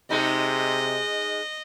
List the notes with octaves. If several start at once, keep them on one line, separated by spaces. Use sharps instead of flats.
C3 G#3 D#4 D#5